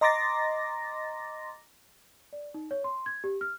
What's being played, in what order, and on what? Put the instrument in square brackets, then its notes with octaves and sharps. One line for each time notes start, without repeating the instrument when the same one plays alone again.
[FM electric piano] D#5 A#5 C6 D6 A6 A#6
[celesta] D5
D#4
C#5
C6
G#6
G4
F6